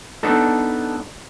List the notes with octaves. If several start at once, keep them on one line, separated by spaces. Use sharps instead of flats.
B3 D4 D#4 A4